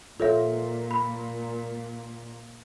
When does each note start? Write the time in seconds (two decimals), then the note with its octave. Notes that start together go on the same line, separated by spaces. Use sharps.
0.20 A#2 F4 A4 C#5 E5
0.91 B5